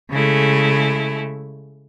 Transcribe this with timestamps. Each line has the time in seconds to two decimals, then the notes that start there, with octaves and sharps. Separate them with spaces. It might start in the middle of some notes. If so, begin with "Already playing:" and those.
0.11 C#3 G#3 A3 E4